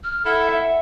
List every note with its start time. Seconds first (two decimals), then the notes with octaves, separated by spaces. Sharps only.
0.04 F6
0.25 E4 A4 F#5
0.49 E5